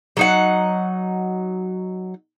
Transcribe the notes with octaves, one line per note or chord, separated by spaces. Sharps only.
F#3 D#4 F#5